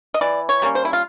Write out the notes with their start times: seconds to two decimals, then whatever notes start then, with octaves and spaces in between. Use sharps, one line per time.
0.14 D#5
0.21 E3 D5
0.49 C#5
0.62 G3 A#3 C#4
0.75 C5
0.85 E4
0.93 F4